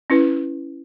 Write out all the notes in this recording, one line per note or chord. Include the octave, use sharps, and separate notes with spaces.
C#4 E4 B4